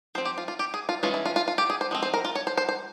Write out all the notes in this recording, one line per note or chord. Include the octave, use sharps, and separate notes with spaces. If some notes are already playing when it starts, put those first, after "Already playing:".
F3 C4 C5
G4
F4
F4
G4
G#4
F4
E3 G#3 C#4 F4
E4
F4
F4
F4
G4
G#4
C5
F3 G#3 C4
C5
A#4
F4
C#5
C5
C5
C5